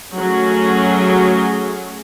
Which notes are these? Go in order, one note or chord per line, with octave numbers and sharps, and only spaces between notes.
F#3 A3 C#4 G#4